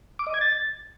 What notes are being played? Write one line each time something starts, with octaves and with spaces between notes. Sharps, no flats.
D6
D#5
G#6
A6